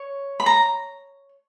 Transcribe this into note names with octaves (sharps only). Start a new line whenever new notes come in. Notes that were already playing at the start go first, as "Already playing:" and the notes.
Already playing: C#5
B5
A#5